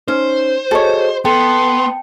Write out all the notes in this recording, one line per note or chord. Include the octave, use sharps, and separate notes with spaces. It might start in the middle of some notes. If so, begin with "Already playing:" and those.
C#4 D#4 C5
F#4 G#4 A4 C#5 D#5
B3 A4 G5 A5 C6 C#7